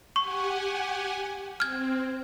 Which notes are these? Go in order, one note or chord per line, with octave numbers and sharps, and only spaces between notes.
G4 F#5 G#5 C#6
C4 F6 G#6